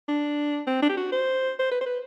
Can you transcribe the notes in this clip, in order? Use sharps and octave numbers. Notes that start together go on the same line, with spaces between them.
D4
C4
D4
G4
F#4
C5
C5
B4
C5
B4